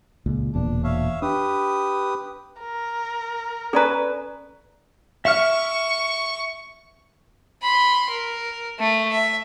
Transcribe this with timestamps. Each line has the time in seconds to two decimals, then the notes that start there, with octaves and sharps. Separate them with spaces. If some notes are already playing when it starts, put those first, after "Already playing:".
0.26 C#2 A#2
0.54 E1 E2 A#2 D4
0.84 C#5 E5 F5
1.22 D4 G4 B4 D#6
2.60 A#4
3.73 C#4 A4 B4 D5 A#5
5.25 E5 C#6 F6
7.63 B5 C6
8.10 A#4
8.79 A3
9.12 E5